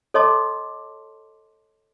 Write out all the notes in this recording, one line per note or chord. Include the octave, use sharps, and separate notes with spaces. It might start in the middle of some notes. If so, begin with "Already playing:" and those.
A4 C#5 D#5 A5 C6 D6